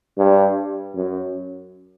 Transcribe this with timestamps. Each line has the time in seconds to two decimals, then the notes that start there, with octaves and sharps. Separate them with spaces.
0.17 G2
0.95 F#2